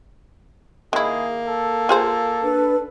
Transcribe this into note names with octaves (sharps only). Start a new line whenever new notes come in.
D#3 A#3 E4 G#4
A4
F4 G#4 C5
D4 B4